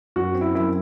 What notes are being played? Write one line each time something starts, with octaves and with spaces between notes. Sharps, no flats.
F#2 F#4
C4
E4
F#2 E4